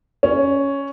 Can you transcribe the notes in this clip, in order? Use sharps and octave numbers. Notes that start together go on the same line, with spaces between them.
C#4